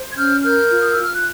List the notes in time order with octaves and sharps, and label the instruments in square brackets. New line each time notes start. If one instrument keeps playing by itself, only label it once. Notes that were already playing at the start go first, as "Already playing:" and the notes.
Already playing: [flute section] C5
G#6
C#4 F6 G6
A#4 F6 G6
F4
D#6
E6
F4 F6
F#6